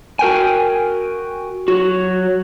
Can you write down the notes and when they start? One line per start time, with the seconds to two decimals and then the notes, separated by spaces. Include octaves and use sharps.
0.19 F#4 A#4 G5 G#5
1.68 F#3 F#4